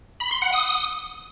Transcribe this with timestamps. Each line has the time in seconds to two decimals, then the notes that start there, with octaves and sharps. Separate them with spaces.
0.20 B5
0.31 C6
0.42 F#5
0.53 D#6